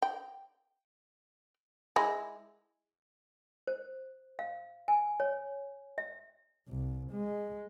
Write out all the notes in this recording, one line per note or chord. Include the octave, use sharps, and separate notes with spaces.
G5
G#3 E4
C5
F5
G#5
C#5
E5
C2
G#3